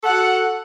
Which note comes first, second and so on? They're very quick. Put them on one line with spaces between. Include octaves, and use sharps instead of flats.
A4 F#5 F#4